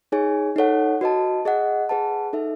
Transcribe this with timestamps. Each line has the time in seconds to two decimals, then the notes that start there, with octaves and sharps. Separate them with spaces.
0.12 D#4 G#4 C#5 G#5
0.56 D#4 A4 C#5 F#5
1.01 F#4 B4 D#5 A5
1.45 G#4 D#5 F#5
1.89 G#4 B4 F#5 A5
2.33 D#4 A4 E5